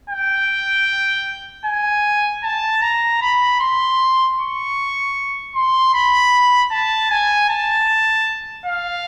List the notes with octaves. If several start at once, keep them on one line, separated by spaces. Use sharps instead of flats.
G5
G#5
A5
A#5
B5
C6
C#6
C6
B5
A5
G#5
A5
F5